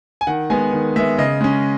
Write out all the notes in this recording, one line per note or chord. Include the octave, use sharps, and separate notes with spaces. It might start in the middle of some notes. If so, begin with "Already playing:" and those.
G#5
D#3 F#5
G#3 B3 G#5
D#3
G#3 B3 E5
C#3 D#5
G#3 C#4